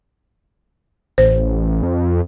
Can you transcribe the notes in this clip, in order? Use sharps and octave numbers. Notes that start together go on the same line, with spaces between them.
A1 C5
F2